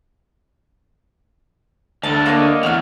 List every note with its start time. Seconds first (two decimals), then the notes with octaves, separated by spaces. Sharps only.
2.03 D2 D3 A5
2.26 A#3 C#5 D#5
2.63 E2 F#4 F6